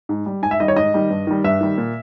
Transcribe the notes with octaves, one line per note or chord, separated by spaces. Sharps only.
G#2
G3
G#2 G#5
E5
D#3 G3 D#5
C#5
G#2 D#5
D#3 G3
G2
D#3 G3
G2 E5
D#3 G3
A#2